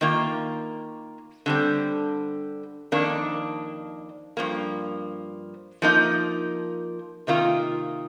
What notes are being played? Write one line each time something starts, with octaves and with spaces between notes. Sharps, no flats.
D#3 A#3 F4
D3 G3 C4
F2 D#3 A#3 D4
G2 F3 A#3
F3 A#3 D#4
C3 D#3 A#3 F4